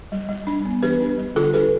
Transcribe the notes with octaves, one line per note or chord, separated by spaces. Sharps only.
G3
G3
D4
B3
E3 G4 B4
D4
G3
D3 F4 A4
D4 G4 B4